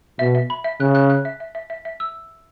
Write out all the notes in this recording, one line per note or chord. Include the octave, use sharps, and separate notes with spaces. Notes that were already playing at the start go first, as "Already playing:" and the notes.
B2 E5
E5
B5
E5
C#3 F#6
F#6
F#6
E5
E5
E5
E5
E5
E6